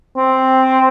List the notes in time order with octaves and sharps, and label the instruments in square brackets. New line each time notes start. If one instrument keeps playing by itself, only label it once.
[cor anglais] C4